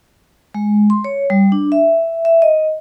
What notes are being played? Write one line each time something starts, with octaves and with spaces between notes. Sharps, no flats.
G#3
C6
C#5
G3
D4
E5
E5
D#5